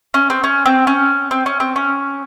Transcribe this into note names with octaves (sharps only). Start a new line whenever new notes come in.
C#4
C4
C#4
C4
C#4
C4
C#4
C4
C#4